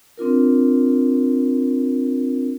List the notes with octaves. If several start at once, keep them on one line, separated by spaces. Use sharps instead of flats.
C4 D4 F4 A#4